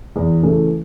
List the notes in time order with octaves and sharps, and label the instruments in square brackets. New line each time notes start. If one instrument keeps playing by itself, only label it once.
[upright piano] E2
C#3 E3 A3